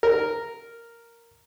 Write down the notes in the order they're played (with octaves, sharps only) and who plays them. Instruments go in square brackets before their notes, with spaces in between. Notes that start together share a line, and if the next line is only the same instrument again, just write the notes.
[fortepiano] A#4